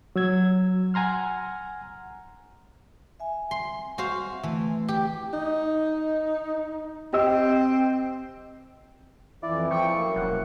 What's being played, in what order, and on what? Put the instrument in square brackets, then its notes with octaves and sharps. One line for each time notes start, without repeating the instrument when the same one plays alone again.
[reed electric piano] F#3 E6 G#6
F#5 G#5 A#5 C6 F6
[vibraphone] E5 G#5
[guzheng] C6
F#4 C5 F5
[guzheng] E3 [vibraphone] A3
[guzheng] G4
[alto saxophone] D#4
[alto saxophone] C4 [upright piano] G4 D#5 E6
[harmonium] F2 E3 [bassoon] E4 [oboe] D5
[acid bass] F3 [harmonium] G5 [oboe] C#6
[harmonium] F#2 A#3
[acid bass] E1 [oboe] F#5